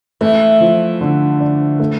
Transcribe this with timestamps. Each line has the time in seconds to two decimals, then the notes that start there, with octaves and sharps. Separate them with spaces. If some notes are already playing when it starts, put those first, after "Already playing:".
0.21 E3 A3
0.60 F3
1.01 D3
1.40 D4
1.80 A3